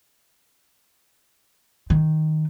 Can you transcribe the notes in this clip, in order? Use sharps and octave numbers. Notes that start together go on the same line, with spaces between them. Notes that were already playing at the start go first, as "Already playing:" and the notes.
D#3